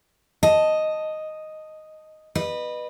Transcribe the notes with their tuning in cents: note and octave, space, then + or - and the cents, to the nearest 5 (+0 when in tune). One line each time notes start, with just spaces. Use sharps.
D#5 +0 A5 +0
B4 -10 D#5 -35